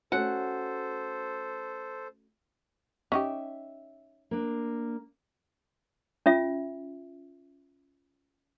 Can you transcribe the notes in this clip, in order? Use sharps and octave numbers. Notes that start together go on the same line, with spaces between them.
A3 C#4 F#4 A4 C5 F#5
C#4 D#4 G4 E5
A#3 D4
C#4 F4 E5